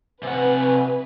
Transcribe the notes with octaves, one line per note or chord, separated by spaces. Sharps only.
C3 B4 F#5 G#5